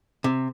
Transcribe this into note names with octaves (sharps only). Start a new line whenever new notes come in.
C3